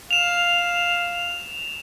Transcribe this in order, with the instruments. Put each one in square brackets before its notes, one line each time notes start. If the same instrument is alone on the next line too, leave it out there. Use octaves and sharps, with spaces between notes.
[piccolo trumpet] F5 [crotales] E7 F7